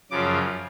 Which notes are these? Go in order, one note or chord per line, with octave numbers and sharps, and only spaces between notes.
F#2 C#3 F3 D6